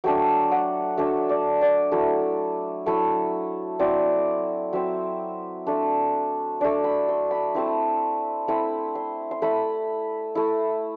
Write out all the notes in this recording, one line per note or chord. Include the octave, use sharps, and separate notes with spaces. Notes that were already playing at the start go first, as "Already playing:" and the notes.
F#3 A3 D4 G5
F#5
F#3 A3 D4 E5
D5
D5
F#3 A3 E4
F#3 A3 E4
F#3 C4 E4 D5
F#3 C4 E4 E5
A3 D4
A3 D4 D5
B5
C6
B5
A3 C4 E4
A3 C4 E4 B5
C6
C6
A3 E4 B5
A3 E4